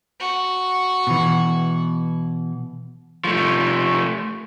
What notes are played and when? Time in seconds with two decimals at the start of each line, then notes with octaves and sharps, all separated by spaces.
0.21 F#4
1.07 B2 E3
3.24 F3 A3